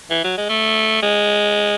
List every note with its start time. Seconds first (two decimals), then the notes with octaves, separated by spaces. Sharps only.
0.10 E3
0.24 F#3
0.37 G#3
0.49 A3
1.02 G#3